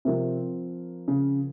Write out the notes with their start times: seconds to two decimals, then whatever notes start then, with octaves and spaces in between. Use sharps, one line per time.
0.05 C3 F3 C4 F4 A#4
1.08 C#3